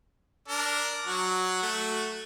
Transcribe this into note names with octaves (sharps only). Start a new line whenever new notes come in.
D4 A#4
F#3 F#4
A3 F#4